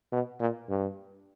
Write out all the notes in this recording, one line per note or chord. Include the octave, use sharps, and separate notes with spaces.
B2
A#2
G2